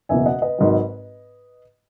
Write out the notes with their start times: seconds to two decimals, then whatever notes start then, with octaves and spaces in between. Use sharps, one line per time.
0.09 F#1 E2 B2 E5 G#5
0.26 D#5 F#5
0.42 B4 D#5
0.58 G#1 G#2 F#3